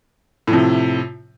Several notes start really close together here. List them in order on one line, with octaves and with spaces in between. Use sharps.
A2 F3 C3